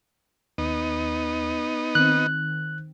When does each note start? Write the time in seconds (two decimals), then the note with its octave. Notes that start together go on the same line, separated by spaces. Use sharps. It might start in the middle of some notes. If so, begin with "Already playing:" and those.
0.58 D#2 B3 D#4
1.95 D#3 C4 F#6